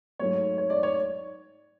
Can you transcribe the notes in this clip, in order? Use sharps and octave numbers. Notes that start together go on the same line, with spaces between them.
G#2 F#3 A3 C#5
C#5
D5
C#5